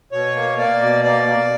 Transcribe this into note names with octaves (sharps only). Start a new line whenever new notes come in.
B2 C#5
A#3
A#3 D5
B2
A#3 D5
A#3